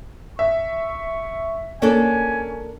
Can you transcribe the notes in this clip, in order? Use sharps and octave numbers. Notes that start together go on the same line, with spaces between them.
E5 C#6
A#3 C#4 D4 A4 G#5